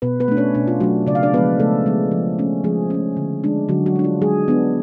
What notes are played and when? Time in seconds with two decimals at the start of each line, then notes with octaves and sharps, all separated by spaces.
0.02 B2 B3 B4
0.20 B3 B4
0.28 A3 D4
0.37 C#4 C#5
0.55 B2 D4
0.67 F4
0.80 F#3 A3 D4 F#4
1.07 C#3 D5
1.15 F5
1.23 D4 D5
1.34 F3 G#3 B3 B4
1.60 C#3 A3 A4
1.86 F3 G#3 B3
2.11 F3
2.39 A3 C#4
2.64 F3 G#3 G#4
2.90 A3 C#4
3.17 D3
3.44 G#3 D4
3.69 D3 F#3 F#4
3.86 F#3 F#4
3.96 G#3 D4
4.04 F4
4.22 F#3 G#3 G#4
4.48 B3 D4